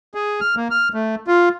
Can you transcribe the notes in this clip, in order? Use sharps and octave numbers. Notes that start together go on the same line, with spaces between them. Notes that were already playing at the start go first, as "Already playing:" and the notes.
G#4
F6
A#3
F6
A3
F4